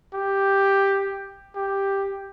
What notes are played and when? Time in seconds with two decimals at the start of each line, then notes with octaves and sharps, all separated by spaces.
0.14 G4
1.56 G4